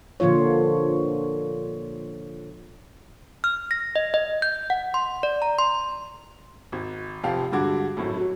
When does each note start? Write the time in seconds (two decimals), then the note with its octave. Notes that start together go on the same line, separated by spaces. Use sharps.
0.20 A#2 D3 F3 F4 C#5
3.44 F6
3.71 A#6
3.96 D#5
4.14 D#5
4.42 G6
4.70 F#5
4.94 C6
5.23 D5
5.42 A#5
5.59 C6
6.72 G#1
7.23 F1 F2 F3 G4 F5 G5
7.52 G2 D3 G#3 F#4 D6 G#6
7.97 G#1 F#2 A2
8.17 F#3